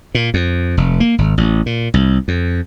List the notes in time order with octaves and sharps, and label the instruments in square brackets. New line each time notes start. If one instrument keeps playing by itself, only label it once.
[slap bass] A#2
F2
F1
A#3
G#1
A1
A#2
C2
F2